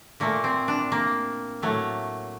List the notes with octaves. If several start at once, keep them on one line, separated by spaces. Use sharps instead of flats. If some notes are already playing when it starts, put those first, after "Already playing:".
A#2 A3 A#3
C4
D4
A#3
A2 F#3 A3